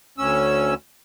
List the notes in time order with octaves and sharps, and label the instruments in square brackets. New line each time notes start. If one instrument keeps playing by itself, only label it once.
[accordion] D2 C#4 E6